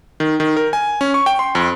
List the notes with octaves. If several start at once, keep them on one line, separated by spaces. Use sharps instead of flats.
D#3
D#3
A#4
G#5
C#4
C#6
G5
C6
F2